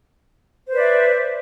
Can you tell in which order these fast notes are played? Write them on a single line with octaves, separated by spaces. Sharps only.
C5 B4 D5 E5